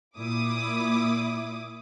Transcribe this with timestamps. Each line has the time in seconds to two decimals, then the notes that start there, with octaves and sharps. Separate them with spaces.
0.18 A#2 E4 D6 D#6